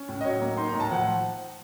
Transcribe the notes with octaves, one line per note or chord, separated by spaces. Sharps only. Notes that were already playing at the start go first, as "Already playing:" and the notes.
Already playing: C#4
A2
D#5
F#3 C#5
A#3
D#4 C6
A#5
A2
A5
F3 F#5